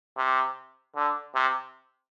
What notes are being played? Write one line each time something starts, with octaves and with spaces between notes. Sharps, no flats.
C3
D3
C3